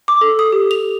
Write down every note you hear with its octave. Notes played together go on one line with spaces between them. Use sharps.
D6
A4
D#6
G4
F7